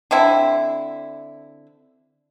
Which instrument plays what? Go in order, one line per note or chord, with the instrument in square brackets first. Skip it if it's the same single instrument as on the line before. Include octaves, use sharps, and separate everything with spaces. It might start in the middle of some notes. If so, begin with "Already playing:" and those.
[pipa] D3 C4 E4